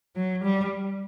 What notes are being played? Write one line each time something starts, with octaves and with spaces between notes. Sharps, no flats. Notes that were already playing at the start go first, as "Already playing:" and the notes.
F#3
G3